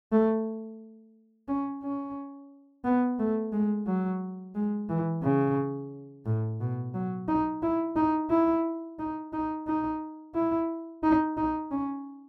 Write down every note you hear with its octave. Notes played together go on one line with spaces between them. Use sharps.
A3
C#4
C#4
B3
A3
G#3
F#3
G#3
E3
C#3
A2
B2
F#3
D#4
E4
D#4
E4
D#4
D#4
D#4
E4
D#4
D#4
C#4